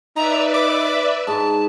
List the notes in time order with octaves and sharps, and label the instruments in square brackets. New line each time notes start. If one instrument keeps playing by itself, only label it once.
[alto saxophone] D#4 [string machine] B4 D5 E5 [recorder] A#5
[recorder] D6
[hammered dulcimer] G#2 [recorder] A5